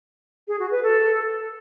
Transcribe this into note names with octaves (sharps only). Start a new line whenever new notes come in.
G#4
F#4
B4
A4